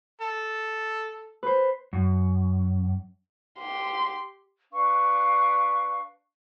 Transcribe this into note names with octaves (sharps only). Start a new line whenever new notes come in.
A4
B4 C5
F#2
G4 C6
D4 B4 F5 C#6